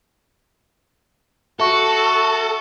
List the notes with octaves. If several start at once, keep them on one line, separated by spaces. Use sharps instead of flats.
F#4 A4 E5 C#6